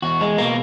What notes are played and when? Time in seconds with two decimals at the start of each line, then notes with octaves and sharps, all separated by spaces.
0.02 E2 F#4
0.21 G#3
0.38 B2 A#3